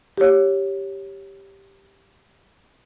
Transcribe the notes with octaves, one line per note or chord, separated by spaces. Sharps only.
G4 C#5